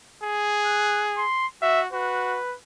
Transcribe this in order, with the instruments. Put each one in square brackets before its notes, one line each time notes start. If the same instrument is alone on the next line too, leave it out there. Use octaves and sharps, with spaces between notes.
[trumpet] G#4
[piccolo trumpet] F#6
C6
[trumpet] F#4 [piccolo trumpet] E5
[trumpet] F#4 [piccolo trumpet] B4